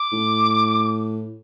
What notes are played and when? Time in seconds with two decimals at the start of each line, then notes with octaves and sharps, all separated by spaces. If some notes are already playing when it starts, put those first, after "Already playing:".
Already playing: D6
0.12 A2